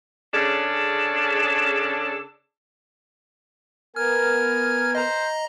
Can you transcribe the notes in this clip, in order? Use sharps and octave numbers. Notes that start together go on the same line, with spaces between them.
C#3 C#4 D4 G#4 A4
B3 A#4 G#5 F6
C5 D#5 A#5